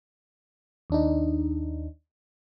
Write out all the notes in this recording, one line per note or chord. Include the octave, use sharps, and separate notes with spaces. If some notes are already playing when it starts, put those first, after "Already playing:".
D#2 D4 D#4